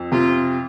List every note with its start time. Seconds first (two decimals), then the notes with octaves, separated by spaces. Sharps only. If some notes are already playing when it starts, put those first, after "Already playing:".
Already playing: F2
0.12 C3 F4